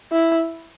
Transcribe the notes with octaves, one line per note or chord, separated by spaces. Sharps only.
E4